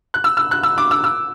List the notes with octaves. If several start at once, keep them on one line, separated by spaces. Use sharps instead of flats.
F#6
E6
E6
F#6
E6
D6
E6
E6